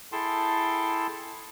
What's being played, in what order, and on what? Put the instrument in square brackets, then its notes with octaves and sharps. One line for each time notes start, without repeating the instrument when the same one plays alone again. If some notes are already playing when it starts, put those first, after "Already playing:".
[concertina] E4 G#4 A4 G5 A5 C6